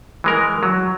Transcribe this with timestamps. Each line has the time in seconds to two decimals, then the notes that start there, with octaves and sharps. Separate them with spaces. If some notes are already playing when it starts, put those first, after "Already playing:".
0.24 E3 G#3 A#4
0.63 F#3